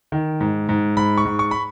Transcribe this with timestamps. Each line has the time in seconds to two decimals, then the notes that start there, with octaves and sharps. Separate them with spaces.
0.12 D#3
0.41 G#2
0.69 G#2
0.97 G#2 B5
1.18 C#6
1.25 G#2
1.39 C#6
1.51 B5